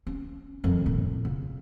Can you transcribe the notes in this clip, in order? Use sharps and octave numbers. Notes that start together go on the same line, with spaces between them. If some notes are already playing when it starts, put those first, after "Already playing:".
C#4
F2 D#3
A#2 E4
C#3